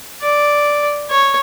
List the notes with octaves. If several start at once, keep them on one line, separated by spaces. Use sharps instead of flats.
D5
C#5